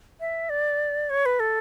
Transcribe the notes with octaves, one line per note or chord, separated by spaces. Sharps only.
E5
D5
C#5
B4
A4